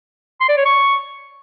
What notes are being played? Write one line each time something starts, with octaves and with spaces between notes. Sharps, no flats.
C6
D5
C#5
C#6